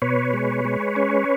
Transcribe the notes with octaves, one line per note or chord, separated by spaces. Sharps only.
B2 B4 C#5
G#3
G#3
C#4